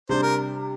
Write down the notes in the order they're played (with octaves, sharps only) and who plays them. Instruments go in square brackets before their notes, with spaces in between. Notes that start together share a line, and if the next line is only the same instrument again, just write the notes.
[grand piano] C3 G3 D4 [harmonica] C5
[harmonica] A#4